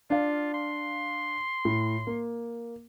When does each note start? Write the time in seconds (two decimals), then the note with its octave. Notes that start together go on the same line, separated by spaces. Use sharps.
0.10 D4 F4 F5
0.54 C6
1.65 A2
2.07 A#3